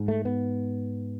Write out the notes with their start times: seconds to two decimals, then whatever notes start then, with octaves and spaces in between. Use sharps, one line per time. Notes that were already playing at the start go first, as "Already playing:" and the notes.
Already playing: G#2
0.08 A3
0.25 B3